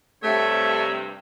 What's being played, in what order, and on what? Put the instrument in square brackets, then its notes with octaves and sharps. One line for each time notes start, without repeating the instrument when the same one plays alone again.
[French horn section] G2 C3 [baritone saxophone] A3 [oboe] C#5 [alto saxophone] E5